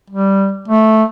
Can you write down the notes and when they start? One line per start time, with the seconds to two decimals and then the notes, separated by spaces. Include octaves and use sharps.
0.10 G3
0.68 A3